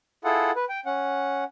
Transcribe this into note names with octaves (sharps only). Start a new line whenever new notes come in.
E4 F4 G#4 A4 F#5
B4
G5
C#4 F#5